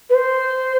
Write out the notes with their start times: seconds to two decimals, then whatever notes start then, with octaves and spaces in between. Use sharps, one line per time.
0.10 B4
0.14 C5